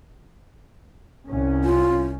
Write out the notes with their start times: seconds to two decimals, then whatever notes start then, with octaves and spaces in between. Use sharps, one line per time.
1.28 C2 C#4
1.64 F4